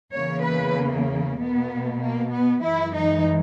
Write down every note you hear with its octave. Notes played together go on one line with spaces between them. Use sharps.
E2 C#3 E3 A#3 C#5
B4
B2 A#3 B3
A#3
B3
F#2 E3 G#3 E4
D#4